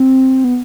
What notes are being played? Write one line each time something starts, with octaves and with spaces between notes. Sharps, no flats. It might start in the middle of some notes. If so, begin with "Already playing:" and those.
Already playing: C4
B3